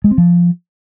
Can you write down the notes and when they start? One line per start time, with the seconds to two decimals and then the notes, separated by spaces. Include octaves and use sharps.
0.04 G#3
0.11 C4
0.18 F3